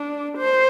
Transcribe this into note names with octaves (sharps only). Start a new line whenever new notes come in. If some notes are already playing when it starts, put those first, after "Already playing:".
Already playing: D4
C5